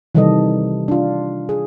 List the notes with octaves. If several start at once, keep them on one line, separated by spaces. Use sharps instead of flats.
C3 D#3 E3 G3 A4 D#5
D4 F4
G#4